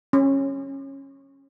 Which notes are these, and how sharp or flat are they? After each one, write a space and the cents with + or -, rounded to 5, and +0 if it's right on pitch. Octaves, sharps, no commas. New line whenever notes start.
C#4 -15